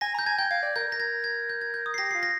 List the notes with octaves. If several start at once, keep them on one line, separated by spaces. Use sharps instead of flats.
G#5 A#6
A#5 G6
G#5 G#6
G5 G6
F5 G#6
D5
A#4 G6
A#4 A#6
G#6
G#6
G6
G#6
G6
D#6
C7
G4 A#6
F4 C7
A#6